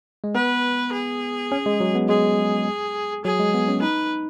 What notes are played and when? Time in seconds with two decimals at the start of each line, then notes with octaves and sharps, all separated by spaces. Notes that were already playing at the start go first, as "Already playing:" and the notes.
0.24 G#3
0.35 B3 B4
0.93 G#4
1.52 C#4
1.66 G#3
1.80 F#3
1.95 B3
2.09 G#3 G#4
3.25 F#3 G#4
3.39 G#3
3.54 B3
3.68 C#4
3.82 D#4 B4